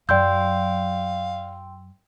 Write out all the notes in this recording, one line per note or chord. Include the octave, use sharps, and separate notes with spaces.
F#2 F#3 D5 F5 G5 C6 E6 G6